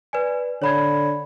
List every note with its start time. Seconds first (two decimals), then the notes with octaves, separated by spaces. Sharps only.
0.13 B4 D5 G#5
0.62 D3 C#5 B5 G#6